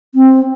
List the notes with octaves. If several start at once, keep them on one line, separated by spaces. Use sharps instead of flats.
C4